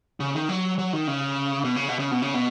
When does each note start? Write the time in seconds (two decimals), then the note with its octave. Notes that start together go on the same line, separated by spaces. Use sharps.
0.20 C#3
0.34 D#3
0.49 F#3
0.79 F#3
0.93 D#3
1.08 C#3
1.64 B2
1.76 C#3
1.88 B2
1.99 C#3
2.11 B2
2.22 C#3
2.34 B2